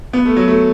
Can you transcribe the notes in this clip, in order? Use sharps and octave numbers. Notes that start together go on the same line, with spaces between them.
B3
A3
F#3
A3